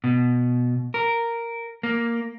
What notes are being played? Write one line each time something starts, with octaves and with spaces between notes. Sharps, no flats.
B2
A#4
A#3